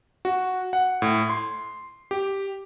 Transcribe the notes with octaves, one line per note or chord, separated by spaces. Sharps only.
F#4
F#5
A2
C6
G4